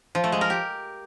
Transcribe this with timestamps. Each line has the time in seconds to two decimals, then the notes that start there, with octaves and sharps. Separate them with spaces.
0.15 F3
0.24 A3
0.32 G#3
0.41 A#4
0.50 G4